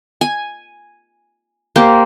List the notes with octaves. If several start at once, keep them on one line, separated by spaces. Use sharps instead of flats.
G#5
A#3 G4 C5